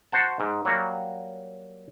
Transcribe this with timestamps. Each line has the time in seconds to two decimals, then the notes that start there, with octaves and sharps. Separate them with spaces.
0.12 F#4 C5 F#5 A5
0.40 G#2
0.65 F#3 G3 A#3 F#4